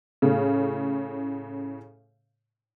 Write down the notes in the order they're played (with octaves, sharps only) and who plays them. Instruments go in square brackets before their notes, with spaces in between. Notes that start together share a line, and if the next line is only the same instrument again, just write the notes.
[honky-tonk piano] A2 C#3